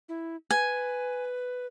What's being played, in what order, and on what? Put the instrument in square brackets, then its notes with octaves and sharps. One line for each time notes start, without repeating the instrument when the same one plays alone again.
[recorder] E4
[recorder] B4 [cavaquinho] G#5